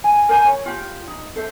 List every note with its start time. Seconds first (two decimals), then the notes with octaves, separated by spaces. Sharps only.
0.04 G#5
0.29 A#4 C5 G#5 B5
0.45 C#5
0.66 F4 G4
1.08 D#4
1.36 A4 C5 E5